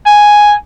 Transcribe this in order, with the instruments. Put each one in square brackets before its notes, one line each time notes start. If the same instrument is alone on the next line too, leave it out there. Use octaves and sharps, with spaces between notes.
[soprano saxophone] G#5